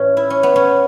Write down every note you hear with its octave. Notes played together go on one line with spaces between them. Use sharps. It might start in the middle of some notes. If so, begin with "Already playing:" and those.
Already playing: A2 E3 C#4 A4
E4
C#4
B3
C#4